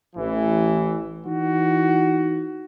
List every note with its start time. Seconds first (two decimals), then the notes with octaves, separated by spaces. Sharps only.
0.16 A1 E3
1.26 E3 D#4 F#4